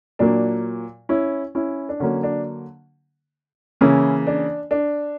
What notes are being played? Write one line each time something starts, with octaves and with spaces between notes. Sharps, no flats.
A#2 F#3 A#3 D4
C#4 E4
C#4 E4
D4
D3 F#3 A#3 C#4
D4
C#3 E3 A#3 C#4 E4
D4
D4